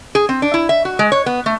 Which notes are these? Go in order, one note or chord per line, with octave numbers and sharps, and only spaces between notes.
G#4
C4
D4
E4
E5
F#4
G#3
C#5
B3
A3